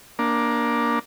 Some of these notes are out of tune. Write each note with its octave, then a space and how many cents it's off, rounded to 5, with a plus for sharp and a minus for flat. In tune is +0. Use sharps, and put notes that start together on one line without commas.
A#3 +15 D4 +0